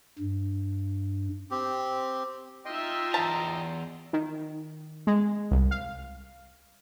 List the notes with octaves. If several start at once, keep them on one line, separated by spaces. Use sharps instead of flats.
G2
C4 G4
D#4 F4 D#5 E5 G5 C6
E2 A5 A#5
D#3
G#3
C2
F5